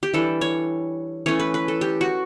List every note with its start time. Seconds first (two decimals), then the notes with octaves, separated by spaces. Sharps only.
0.03 G4
0.14 E3 G3 D4 A4
0.41 C#5
1.26 E3 A3 C#4 C#5
1.40 B4
1.54 B4
1.68 A4
1.81 G4
2.01 F#4